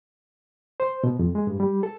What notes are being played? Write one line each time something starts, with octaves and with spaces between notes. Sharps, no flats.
C5
B2
F2
G#3
G2
G3
A4